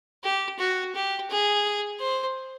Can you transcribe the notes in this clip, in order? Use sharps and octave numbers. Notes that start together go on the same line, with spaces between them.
G4
F#4
G4
G#4
C5